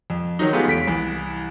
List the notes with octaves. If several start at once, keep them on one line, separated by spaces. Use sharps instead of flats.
F2
D#3 F#3 D#4
G#3 A3 B3 F4 G4 G#4
E2 B6 D7
C2 E3